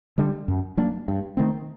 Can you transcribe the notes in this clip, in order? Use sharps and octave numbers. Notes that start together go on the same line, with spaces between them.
D3 G3 D4
F#2
F#3 A#3 D4
G2
D#3 A3 C4